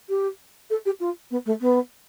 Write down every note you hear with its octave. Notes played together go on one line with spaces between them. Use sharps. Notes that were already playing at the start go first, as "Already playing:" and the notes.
G4
A4
G4
F4
B3
A3
B3